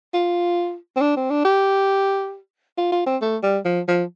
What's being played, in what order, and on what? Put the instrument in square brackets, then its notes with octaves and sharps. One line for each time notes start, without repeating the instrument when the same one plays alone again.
[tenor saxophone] F4
C4
D4
C4
D4
G4
F4
F4
C4
A3
G3
F3
F3